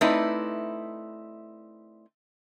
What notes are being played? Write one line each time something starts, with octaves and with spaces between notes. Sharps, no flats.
A3 C4 D#4 E4 B4 D5